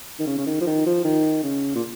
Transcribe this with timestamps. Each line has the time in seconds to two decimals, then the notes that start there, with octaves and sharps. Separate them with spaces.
0.19 D#3
0.27 C#3
0.38 C#3
0.46 D#3
0.61 F3
0.66 D#3
0.86 F3
1.04 D#3
1.43 C#3
1.75 A#2